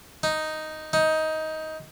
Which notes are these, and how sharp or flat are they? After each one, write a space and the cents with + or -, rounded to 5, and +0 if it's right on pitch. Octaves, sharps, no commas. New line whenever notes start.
D#4 +0
D#4 +15